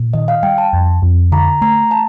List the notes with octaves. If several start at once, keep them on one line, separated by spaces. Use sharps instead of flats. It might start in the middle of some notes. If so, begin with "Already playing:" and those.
Already playing: A#2
D#3 D#5
F5
G3 G5
A5
F2
F2
D3 A#5
A3 A#5
A5